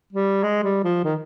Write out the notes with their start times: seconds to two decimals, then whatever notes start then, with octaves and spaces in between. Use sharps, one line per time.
0.13 G3
0.44 G#3
0.63 G3
0.84 F3
1.04 D#3